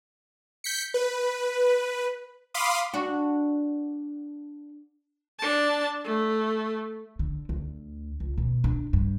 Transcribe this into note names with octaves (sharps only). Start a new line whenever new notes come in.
G6 B6 C#7
B4
F5 B5 C6 D6 D#6
D4 F#4
D4 A5
A3
D3
D2
C#2
B2
D4
G2